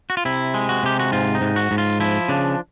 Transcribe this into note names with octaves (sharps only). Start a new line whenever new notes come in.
F#4
F4
C3 E4
G#3
F#4
C3 G4
F#4
G#2 F4
D#4
G#2
F#4
G#2
F4
F3 E4
C#3 D4